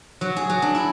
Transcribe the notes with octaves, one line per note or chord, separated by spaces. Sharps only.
F#3
G#4
F#3
D4
E4